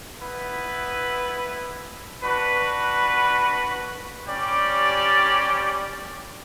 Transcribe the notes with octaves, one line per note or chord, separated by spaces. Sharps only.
B3 E4 B4
D4 F#4 B4
G3 C#4 G4 D5